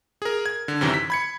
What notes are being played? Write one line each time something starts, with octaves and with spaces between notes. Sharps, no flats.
G#4 A#4
G#6
D3
F#2 C3 D#3 E3
B6
B5 G#6 C#7